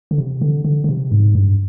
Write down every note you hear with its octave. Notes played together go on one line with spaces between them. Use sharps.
D3
C3
D3
D3
D3
C3
G#2
G2